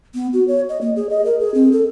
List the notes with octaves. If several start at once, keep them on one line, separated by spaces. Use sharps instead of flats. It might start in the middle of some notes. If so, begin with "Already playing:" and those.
B3
F#4
C#5
D#5
A#3
G#4
D#5
A#4
G#4
C4
A4